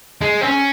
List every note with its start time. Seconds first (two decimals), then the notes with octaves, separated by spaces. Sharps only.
0.21 G#3
0.41 C4
0.45 C#4